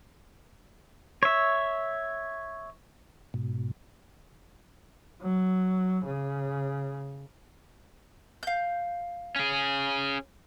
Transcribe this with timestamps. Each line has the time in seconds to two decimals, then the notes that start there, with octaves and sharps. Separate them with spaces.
1.23 C#5 E5
3.34 G#2 B2
5.22 F#3
6.05 C#3
8.43 F5 G6
9.36 C#4 G#4